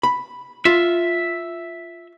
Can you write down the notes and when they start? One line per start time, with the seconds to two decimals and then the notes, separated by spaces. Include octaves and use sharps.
0.03 B5
0.65 F4 E5